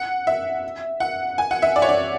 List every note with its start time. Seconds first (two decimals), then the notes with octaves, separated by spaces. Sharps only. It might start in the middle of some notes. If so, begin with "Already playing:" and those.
Already playing: F#5
0.27 E5
1.00 F#5
1.38 G#5
1.51 F#5
1.62 E5
1.76 D5
1.82 C#5
1.89 D5